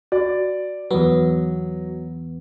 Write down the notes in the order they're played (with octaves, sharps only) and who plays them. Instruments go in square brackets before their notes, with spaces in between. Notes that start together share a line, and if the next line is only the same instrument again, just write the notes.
[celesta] F#4 [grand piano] D5
[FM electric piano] E2 B3 [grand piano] F#3